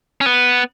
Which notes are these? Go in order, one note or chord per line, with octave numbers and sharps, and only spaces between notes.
C#4
B3